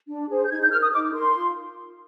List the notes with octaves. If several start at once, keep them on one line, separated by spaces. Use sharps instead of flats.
D4
G#4 C5
G6
D#4 G#6
G6
A#4 F6
D#6
D#4 D6
A#4 C6
F4